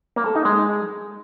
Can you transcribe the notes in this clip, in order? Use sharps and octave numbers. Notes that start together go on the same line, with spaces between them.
A#3
A4
D#4
G#3